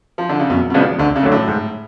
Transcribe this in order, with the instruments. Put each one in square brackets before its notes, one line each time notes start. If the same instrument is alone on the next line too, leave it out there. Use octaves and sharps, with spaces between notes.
[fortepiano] F3
D3
C#3
[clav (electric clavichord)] F#2 [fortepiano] B2
[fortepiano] B2
[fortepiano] C#3 [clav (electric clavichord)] F3 G#3 B3 D4
[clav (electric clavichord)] D2 [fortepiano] D3
[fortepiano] C#3
[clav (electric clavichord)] D3 F#3 A3
[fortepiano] A2
[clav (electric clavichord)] G#2